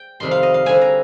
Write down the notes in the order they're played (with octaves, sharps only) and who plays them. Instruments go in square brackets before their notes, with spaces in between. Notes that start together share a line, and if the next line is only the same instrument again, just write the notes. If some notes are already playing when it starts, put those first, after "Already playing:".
Already playing: [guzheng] G5
F2 C3 D#3 G3 C6
F5
D#5
F5
D3 G3 C4 G#5
A#5